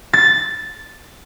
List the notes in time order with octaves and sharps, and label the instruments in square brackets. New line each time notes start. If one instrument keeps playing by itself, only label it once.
[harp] A6